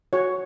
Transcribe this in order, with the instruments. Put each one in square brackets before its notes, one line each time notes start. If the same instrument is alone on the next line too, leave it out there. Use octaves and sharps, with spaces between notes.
[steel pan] F#4 C#5